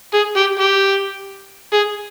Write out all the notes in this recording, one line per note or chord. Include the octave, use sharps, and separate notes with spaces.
G#4
G4
G4
G#4